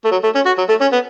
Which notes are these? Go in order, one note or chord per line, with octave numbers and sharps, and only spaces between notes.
A3
F#3
A3
C#4
F#4
F#3
A3
C#4
B3